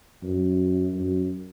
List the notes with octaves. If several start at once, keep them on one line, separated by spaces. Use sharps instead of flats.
F#2
F#2